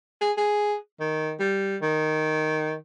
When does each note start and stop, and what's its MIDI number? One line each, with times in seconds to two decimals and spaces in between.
0.21 0.32 68
0.37 0.75 68
1.00 1.34 51
1.40 1.77 55
1.82 2.74 51